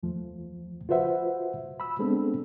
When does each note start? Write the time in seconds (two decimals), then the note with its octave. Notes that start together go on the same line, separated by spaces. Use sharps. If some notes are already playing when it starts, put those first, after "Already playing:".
0.03 E2 F3 A3
0.89 F4 F#4 B4 C5 E5 F#5
1.80 B5 E6
1.99 G#3 B3 C4 D4 G#4 A4